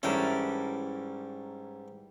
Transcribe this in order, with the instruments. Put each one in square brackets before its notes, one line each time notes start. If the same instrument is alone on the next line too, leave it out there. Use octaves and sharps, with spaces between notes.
[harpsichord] G#2 A4 [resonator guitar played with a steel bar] E3 G3 D4 [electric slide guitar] C#4 A#4